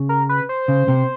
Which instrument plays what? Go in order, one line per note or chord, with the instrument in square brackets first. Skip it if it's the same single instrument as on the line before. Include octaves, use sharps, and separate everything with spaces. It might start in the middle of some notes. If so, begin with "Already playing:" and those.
Already playing: [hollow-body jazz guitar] C#3
[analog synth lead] A#4
B4
C5
[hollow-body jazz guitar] C#3
C3